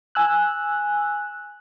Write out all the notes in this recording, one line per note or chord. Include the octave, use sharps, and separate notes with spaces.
G#5 E6 F#6